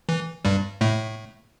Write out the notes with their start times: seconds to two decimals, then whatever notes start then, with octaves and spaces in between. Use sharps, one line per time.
0.09 E3
0.45 G2 G3
0.81 A2 A3